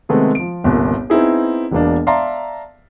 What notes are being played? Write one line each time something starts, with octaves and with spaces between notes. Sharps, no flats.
C3 D#3 G#3 A3 B3 C4
F3 D7
G1 C2 A#2
B3 C4 D#4 E4 G#4
E1 B2 A#3 D4
D5 E5 F5 A5 A#5 C6